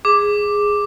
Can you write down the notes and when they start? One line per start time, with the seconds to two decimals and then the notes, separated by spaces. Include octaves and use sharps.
0.05 G#4 D6